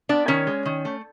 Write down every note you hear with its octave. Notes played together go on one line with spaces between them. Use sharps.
B3 D4 D5
D#3 C#4 C#5
G#3
D#3
A3